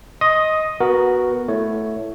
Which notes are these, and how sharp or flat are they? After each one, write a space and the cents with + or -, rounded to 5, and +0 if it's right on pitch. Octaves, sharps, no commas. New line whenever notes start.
D#5 +10 C6 +40 D#6 +0
B3 -10 F#4 +0 A#4 +0
A3 +0 E4 +10 C#5 +10